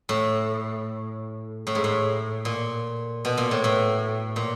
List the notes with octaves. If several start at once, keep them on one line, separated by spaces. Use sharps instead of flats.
A2
A2
G#2
A2
A#2
B2
A#2
A2
A2
A#2